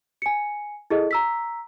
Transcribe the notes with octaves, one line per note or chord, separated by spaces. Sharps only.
G#5 C#7
E4 G#4 A4 D#5
A#5 E6 B6